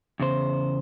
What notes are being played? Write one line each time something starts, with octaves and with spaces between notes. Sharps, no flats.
E2 C#3 C5